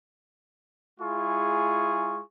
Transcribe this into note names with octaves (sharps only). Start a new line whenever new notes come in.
G#3 E4 F4 G#4 C#6